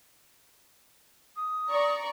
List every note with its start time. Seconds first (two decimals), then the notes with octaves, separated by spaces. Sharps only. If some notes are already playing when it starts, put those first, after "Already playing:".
1.36 D#6
1.69 D5 A#5 C#6